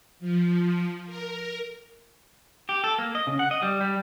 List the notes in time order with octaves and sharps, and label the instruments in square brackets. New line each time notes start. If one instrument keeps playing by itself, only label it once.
[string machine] F3
A#4
[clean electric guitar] G4
A4
A#3
D#5
C#3
F#5
D#5
G3
G3